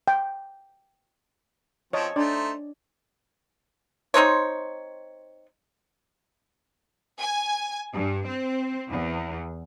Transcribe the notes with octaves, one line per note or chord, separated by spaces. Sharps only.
G5
F3 C4 C#5 D#5 A5
A3 D4 D#4 C5 D5
C4 D#4 C5 C#5
G#5
G2
C4
E2